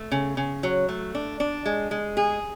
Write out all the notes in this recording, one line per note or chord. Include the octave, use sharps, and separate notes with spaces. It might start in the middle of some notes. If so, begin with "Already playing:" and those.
Already playing: A3
C#3
C#3
F#3
A3
D4
D4
G#3
G#3
G#4